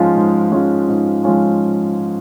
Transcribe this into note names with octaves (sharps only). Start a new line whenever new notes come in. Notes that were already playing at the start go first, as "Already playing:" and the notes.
Already playing: G#2 F3 G#3 C#4 F4
G#2
F3 G#3 C#4 F4
G#2
F3 G#3 C#4 F4